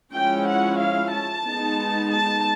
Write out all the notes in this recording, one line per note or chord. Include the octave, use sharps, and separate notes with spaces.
F3 G#3 C#4 E4 G5
F#5
F5
A5
G#3 B3 D#4
A5